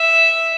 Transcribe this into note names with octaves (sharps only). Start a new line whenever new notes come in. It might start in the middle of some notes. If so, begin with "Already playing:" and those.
Already playing: E5